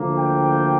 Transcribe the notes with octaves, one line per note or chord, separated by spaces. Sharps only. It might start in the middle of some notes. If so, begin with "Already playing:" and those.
Already playing: D2 D3 F3 A#3
G5